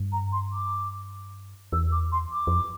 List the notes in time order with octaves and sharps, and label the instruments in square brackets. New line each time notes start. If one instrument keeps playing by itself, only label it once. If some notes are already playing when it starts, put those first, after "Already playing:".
Already playing: [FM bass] G2
[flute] A#5
C6
D6
[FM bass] E2 [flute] E6
[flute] D6
C6
D6
[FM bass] F2